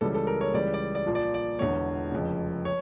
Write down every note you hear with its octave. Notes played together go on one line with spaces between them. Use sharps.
C#2 C#3 E3 G3 A4
A4
A#4
C#5
C#2 C#3 E3 G3 D5
D5
D5
A#1 A#2 F3
D5
D5
E1 E2 D3 C#5
F1 F2 C#3
C#5